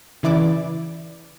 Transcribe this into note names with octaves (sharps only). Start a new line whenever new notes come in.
C#3 E3 E4 D5 D6